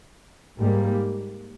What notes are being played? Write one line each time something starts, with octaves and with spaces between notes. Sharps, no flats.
G#2 G3 A#3